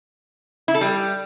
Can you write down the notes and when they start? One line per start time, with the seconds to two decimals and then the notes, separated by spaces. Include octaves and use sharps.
0.68 E4
0.75 A4
0.81 G3